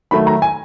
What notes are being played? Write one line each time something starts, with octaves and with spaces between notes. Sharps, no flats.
D#3 F#3 A3 B5
A#5
G#5